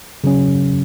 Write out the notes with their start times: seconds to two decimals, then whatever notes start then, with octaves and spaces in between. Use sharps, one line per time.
0.24 C#3 F#3 C#4